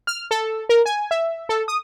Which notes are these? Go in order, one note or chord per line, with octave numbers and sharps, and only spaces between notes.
F6
A4
A#4
G#5
E5
A4
D#6